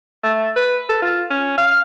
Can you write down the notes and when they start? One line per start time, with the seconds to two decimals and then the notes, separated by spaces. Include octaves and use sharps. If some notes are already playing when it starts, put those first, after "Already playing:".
0.24 A3
0.56 B4
0.89 A4
1.02 F4
1.30 C#4
1.58 F5